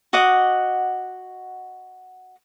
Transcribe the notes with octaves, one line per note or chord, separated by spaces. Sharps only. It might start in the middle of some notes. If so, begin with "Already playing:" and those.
F#4 D#5 F#5 D6